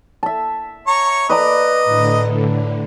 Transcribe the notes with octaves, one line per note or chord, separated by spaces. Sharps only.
E5 A5
C#5 A#5 C#6
B4 D5 D#5 A#5
A2 D3